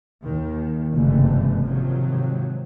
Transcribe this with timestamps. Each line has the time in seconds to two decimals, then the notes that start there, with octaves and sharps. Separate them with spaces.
0.23 D#2 D#3
0.94 F#1 G2 C3 E3 G#3 A3
1.63 G#2 C3 D#3 F3 F#3